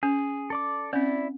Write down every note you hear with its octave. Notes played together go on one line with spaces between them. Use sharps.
C#4 G#4
A4 D5 D6
C4 C#4 E4 D5